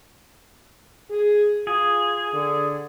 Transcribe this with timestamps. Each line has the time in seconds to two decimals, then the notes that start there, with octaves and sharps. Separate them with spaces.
1.11 G#4
1.67 F4 G#4
2.34 D3